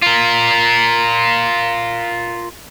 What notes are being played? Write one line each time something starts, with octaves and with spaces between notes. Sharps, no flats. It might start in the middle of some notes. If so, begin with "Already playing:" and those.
F4 A#4